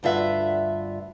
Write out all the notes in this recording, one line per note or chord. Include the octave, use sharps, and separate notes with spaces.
D2 G2 F4 E5 F#5